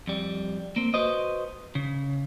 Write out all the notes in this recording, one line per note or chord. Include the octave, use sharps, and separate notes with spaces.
F2 G3
A#3 C4
F#4 B4 C5 D#5
C#3